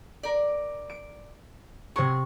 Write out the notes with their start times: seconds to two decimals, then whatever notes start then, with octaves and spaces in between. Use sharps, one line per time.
0.23 A#4 D5
0.90 D7
1.96 C3 F#3 G#4 C#6